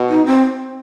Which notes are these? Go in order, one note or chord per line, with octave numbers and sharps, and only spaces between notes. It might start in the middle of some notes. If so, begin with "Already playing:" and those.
Already playing: B2
D#4
C4